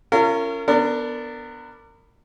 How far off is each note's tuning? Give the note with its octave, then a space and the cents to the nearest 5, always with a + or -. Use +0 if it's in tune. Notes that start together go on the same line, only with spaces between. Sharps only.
C#4 +0 F4 -40 A#4 -30
B3 +0 D4 +0 A#4 -30